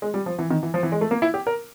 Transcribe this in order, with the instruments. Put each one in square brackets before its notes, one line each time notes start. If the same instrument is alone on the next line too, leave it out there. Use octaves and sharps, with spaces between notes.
[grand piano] G#3
G3
F3
E3
D#3
E3
F3
E3
G#3
A3
A#3
E4
G4
A#4